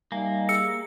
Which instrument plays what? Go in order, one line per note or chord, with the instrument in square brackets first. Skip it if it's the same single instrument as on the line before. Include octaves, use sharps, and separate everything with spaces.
[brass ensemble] G3 D#4 [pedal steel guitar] A#3 [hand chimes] E5 G#5
[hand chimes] G#4 [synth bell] E6 C#7